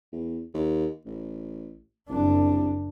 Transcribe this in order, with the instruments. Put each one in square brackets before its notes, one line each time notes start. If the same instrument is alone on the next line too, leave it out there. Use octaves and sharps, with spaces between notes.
[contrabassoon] E2
D#2
A1
[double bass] F#1 D4 [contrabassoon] C2